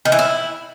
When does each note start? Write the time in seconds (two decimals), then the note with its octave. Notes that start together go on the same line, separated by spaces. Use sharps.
0.05 D#3
0.12 E3
0.19 E4